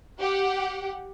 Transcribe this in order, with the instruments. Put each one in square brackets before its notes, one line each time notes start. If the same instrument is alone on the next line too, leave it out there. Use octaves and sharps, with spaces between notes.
[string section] G4 F#5